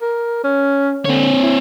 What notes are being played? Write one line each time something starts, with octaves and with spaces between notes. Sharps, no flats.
A#4
C#4
D3 C4 C#5
E4